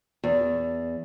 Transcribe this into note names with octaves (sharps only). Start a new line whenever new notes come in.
E2